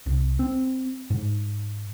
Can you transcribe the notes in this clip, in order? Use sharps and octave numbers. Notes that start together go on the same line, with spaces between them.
C2
C4
G#2